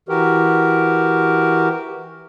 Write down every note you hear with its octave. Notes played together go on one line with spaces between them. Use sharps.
E3 F#4 G4 A#4